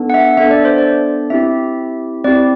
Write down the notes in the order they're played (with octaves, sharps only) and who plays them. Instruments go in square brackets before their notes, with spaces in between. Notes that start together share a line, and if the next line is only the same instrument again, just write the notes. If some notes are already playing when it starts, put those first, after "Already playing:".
Already playing: [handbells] B3 D4 A4
F#5
E5
B3 D4 A4 E5
D5
C5
D5
C4 E4 G4 E5
C4 E4 G4 D5